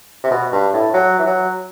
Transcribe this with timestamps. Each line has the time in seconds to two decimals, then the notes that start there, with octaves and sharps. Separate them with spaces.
0.24 C3
0.31 B2
0.52 G2
0.73 A2
0.94 F#3
1.19 E3
1.26 F#3